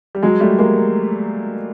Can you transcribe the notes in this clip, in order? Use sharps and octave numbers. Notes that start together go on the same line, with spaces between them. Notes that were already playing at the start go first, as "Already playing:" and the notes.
G3
F#3 G#3
G3 A3
G#3 A#3